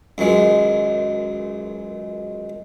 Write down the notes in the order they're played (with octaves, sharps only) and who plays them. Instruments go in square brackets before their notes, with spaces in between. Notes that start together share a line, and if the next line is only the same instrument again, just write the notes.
[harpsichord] C#2 F#2 D#3 G#3